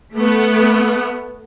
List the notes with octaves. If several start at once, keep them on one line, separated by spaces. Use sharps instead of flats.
A3 B3